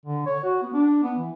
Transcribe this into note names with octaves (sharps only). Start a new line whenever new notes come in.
D3
C#5
F#4
B3
D4
B3
E3